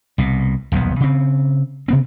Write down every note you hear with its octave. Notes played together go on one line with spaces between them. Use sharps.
C2 B2
D#1 B1 F2 B3
C#3 C4
C3 B3 C4